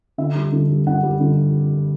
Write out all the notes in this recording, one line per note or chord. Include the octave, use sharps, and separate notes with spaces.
D3 E5
G3
D3
G3
D3 F#5
G3
D3